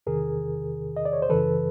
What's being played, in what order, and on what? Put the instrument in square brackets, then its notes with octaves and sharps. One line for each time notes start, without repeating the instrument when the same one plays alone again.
[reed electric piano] E2 C3 D#3 G#4 A#4
D#5
D5
C#5
C5
F#2 C#3 E3 A4 B4